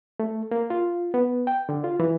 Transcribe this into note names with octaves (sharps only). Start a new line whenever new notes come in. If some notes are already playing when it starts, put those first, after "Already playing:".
A3
A#3
F4
B3
G5
D3
F4
E3